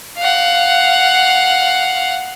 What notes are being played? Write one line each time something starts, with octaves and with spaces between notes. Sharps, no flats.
F5 F#5